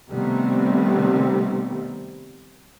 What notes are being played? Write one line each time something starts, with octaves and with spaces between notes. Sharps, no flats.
C3 D#3 G3 A3 B3 C4